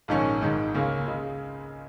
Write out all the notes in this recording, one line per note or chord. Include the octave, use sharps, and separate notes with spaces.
A#1 G#2 D#3 C#4
G#1 G#2 D#3
C#2 C#3 A#3 C#4
C#3 G#3